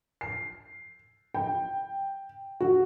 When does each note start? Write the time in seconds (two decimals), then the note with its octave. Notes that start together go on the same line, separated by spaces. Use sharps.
0.21 C7
1.34 G5
2.60 F#4